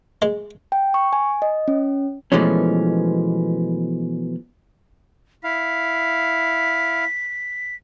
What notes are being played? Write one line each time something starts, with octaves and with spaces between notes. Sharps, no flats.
G#3
G5
C#6
G#5
D#5
C#4
B2 E3 F3 G#3 A3 C#4
E4 F5 B6